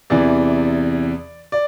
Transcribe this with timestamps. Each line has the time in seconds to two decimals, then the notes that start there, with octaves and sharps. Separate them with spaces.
0.10 E2 C3 E3 D5
1.52 D5